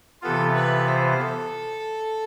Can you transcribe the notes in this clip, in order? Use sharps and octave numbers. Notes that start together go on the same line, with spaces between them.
C3 E3 B3 F4 A4
B4
C5
A4